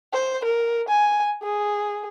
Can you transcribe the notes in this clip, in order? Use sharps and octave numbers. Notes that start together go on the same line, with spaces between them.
C5
A#4
G#5
G#4